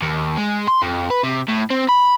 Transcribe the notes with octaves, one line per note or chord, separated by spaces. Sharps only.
D#2
G#3
C6
F2
B4
C3
A2
C4
B5